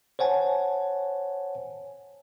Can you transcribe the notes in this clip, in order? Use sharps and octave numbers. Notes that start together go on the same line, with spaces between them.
C5 C#5 F#5 G#5 A5